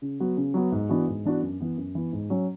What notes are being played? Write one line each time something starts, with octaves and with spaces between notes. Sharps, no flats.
C#3
F#3 B3 F#4
C#3
F#3 B3 F#4
G#2
E3 B3 D4 F#4
G#2
E3 B3 D4 F#4
F#2
E3 B3
F#2
E3 B3
G#2
F#3 C#4